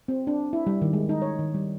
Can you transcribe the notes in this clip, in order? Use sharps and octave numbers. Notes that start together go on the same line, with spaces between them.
C4
D4
E4
G3
D#3
G#3
D#4
C#5
D#3
G3